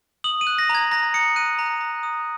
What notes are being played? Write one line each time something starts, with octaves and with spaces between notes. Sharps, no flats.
D#6 F#7
D#7
F#6
A#6
A#5
G#6
A#5 A#6
D#6 C#7
F#6 D#7
A#5
A#5
D#6